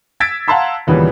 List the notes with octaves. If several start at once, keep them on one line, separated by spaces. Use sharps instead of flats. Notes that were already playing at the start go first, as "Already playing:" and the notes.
E6 G#6 A6 B6 D7
F5 F#5 A5 A#5 C6 E6
D#2 A#2 C#3 E3 G3 B3